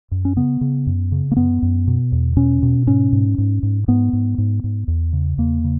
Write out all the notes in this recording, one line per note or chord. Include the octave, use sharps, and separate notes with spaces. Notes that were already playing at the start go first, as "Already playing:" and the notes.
F#2
C#4
C#3 B3
C#3
F#2
C#3
A#3
F#2 B3
F#2
B2
E2
B2 C#4
B2
G#2 C#4
G#2
G#2
G#2
G#2 B3
G#2
G#2
G#2
E2
C#3
E2 A#3
C#3